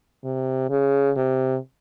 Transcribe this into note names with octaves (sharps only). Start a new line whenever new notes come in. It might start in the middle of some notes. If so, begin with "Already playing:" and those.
C3
C#3
C3